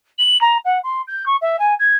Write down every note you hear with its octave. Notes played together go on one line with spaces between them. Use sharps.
F#7
A#5
F#5
C6
G6
C#6
E5
G#5
G#6